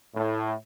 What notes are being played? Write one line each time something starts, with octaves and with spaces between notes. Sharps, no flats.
A2